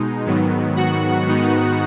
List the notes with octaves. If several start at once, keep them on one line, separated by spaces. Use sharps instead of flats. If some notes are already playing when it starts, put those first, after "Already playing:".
Already playing: B2 G#3 D#4
G#2 D#3 F#3 B3
F#4 F#5
G#2 D#3 B3 D#4